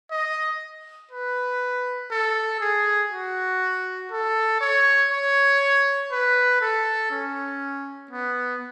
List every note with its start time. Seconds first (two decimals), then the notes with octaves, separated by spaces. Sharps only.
0.11 D#5
1.11 B4
2.11 A4
2.61 G#4
3.11 F#4
4.11 A4
4.61 C#5
5.11 C#5
6.11 B4
6.61 A4
7.11 C#4
8.11 B3